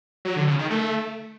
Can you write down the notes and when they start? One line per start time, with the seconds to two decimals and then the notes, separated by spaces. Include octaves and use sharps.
0.25 F#3
0.36 D3
0.48 C#3
0.59 D#3
0.70 A3